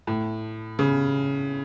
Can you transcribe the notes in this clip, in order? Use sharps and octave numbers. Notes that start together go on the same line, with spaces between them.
A2
C#3